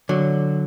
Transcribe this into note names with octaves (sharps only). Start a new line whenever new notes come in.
D3 F#3